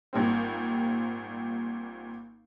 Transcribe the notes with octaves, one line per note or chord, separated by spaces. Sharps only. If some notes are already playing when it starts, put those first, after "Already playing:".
G#1 A#2 G3 C4